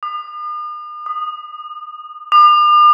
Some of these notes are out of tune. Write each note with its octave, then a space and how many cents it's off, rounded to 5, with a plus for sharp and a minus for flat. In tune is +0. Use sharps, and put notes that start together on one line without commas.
D#6 -45
D#6 -20
D6 +45